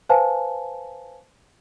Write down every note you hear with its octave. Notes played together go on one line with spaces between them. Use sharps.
B4 C5 F5 G#5 A5